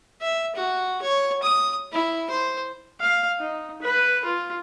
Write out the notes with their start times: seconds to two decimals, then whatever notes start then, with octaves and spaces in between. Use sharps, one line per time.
0.21 E5
0.55 F#4
1.02 C#5
1.43 D#6
1.92 E4
2.30 C5
3.01 F5
3.39 D#4
3.82 B4
4.25 F4